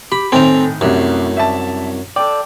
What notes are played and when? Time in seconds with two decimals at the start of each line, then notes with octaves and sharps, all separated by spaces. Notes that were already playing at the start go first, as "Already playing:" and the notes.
0.12 G4 B5
0.32 A2 D#3 C4 A4 G5 G#5 A#5
0.81 C2 F#2 A2 C3 G4
1.37 C2 E5 A5
2.16 A4 D5 G5